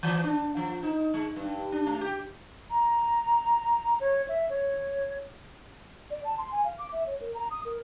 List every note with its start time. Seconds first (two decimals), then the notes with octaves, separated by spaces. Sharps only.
0.03 E3
0.24 D4
0.57 F3
0.83 D#4
1.14 G#3
1.36 G2
1.72 D4
1.87 A3
2.01 G4
2.70 A#5
4.00 C#5
4.29 E5
4.50 C#5
6.10 D5
6.24 A5
6.38 C6
6.51 G#5
6.64 F5
6.78 D6
6.92 E5
7.07 C#5
7.21 A#4
7.34 A#5
7.51 D#6
7.65 A#4